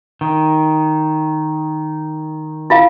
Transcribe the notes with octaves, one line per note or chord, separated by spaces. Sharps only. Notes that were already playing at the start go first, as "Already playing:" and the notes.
D#3
E4 F4 F5